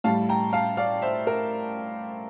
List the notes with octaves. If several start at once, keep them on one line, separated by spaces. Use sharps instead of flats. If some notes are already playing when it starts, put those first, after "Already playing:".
A2 G3 F5 A5
G5 A#5
F5 A5
D5 F5
C5 E5
A#4